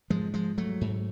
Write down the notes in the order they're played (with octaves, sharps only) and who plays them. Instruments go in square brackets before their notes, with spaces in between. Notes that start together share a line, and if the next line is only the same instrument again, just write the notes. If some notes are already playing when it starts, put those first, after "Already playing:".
[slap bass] G#2 F3 G#3
F3 G#3
F#3 A3
G#2